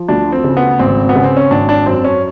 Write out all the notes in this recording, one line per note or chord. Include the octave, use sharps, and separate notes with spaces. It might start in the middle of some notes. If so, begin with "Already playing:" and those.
Already playing: F3
D2 D4
C4
C#3
B3
G#1 C4
B3
C#3
C4
C#4
G#1 D4
D4
F#2 C4
C#4